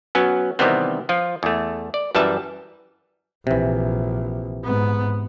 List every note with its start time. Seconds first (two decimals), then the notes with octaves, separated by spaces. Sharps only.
0.15 F#3 B3 C#4
0.59 C3 D#3 E3 G3 B3 C4
1.09 F3 F4
1.43 E2 A3
1.94 D5
2.15 F#2 E3 G3 B4 E5 A5
3.47 A#1 C3 E3
4.64 G#2 B3